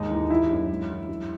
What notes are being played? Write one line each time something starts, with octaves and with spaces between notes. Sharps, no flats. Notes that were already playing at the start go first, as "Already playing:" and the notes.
Already playing: D#2 G#2 D#4
E3
E3 E4
F#2
G#2
E3
F#3